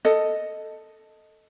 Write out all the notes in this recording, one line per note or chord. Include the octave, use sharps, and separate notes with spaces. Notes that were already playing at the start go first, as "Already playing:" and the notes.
A4 D#5